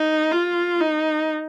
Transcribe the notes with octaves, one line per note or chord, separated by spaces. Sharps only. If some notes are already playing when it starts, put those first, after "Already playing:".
Already playing: D#4
F4
D#4